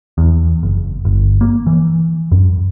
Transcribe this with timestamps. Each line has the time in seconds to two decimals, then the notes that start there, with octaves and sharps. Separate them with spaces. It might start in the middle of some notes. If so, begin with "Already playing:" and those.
0.18 E2
0.63 F#1
1.05 G1
1.41 A#3
1.67 E3
2.32 F#2